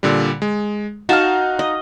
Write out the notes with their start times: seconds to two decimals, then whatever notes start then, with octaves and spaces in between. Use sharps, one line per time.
0.03 A#2 D3 G3
0.42 G#3
1.09 D#4 F#4 F5 A5 F6
1.59 D#5